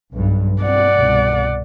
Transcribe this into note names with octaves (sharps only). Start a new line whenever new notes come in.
B1 G2
C4 D5 F#5
C2 B2